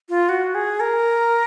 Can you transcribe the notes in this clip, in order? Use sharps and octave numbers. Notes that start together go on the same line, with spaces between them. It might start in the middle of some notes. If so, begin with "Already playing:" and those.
F4
F#4
G#4
A#4